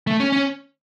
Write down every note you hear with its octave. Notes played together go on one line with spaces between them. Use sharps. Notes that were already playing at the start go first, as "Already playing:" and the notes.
A3
C#4
C#4